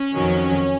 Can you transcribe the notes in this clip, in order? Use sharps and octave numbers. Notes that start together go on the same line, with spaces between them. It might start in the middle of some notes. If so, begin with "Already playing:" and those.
Already playing: C#4
F2 D#3 F#3